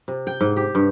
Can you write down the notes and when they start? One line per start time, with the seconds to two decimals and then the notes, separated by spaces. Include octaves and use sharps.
0.08 C3
0.27 G5
0.41 G#2
0.56 G4
0.75 G2